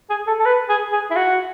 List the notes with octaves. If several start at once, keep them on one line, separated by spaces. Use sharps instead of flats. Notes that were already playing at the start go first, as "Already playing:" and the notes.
G#4
A4
A4
B4
G#4
G#4
E4
F#4